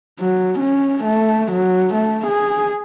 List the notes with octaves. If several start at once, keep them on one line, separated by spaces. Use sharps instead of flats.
F#3
C#4
A3
F#3
A3
G#4